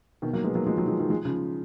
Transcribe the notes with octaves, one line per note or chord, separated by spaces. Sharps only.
B2 D#3
F#3 A#3
G#3 B3
F#3 A#3
F3 G#3
D#3 F#3
F3 G#3
D#3 F#3
F3 G#3
C#3 F3